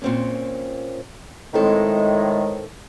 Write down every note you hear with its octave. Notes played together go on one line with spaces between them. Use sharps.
A#2 C4 C#4
A2 D#3 G#3 C4 A4